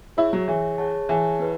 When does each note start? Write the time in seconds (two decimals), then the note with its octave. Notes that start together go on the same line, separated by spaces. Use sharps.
0.17 E4 G#4 C#5 E5
0.33 F#3
0.48 E3 G#4 C#5 E5
0.78 G#4 C#5 F#5 A5
1.09 E3 G#4 C#5 F#5 A5
1.39 B3 E4 B4